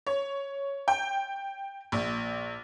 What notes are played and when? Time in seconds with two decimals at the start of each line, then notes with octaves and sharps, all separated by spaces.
0.07 C#5
0.88 G5
1.92 A#1